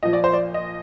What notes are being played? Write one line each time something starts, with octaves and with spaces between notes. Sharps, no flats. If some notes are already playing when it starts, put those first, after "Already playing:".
A#2 F3 D#5
D5
C5
D5
D#5